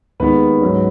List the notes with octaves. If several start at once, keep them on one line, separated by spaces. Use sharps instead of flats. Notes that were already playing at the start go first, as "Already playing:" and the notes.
D#2 D#3 G#3 B3 B4
G#2 F#3 C#4